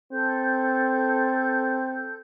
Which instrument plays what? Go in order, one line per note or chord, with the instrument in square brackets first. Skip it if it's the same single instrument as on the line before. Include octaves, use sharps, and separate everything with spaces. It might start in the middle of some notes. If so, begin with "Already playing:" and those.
[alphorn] C4 [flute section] A4 G6